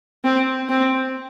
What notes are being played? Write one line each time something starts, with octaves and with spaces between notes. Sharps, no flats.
C4
C4